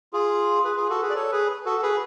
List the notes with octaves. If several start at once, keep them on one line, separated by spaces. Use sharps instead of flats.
F4 G#4
G#4 B4
F4 G#4
F#4 A4
G#4 B4
D5
A4 C#5
G#4 B4
F#4 A4
G#4 B4